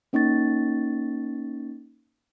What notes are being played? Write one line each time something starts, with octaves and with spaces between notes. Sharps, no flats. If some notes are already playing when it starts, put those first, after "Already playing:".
A#3 C#4 D#4 C#6 A6